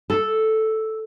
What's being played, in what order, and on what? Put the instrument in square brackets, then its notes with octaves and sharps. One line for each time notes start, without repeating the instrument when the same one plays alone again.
[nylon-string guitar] A4